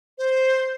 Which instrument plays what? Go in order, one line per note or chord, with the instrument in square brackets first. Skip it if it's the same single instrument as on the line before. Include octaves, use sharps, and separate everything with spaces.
[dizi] C5